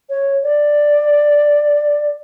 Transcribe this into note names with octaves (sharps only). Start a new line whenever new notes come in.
C#5
D5